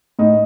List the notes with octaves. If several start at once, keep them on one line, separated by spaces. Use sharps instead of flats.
A2 D#4